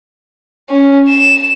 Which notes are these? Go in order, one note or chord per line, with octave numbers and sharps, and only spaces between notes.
C#4
E7